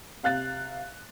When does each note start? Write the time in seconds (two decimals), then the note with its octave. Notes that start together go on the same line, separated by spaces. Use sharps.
0.23 C3 F5 F#6 A6